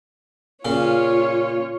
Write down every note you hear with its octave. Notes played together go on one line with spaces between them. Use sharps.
A#2 C#3 C#4 F4 C#5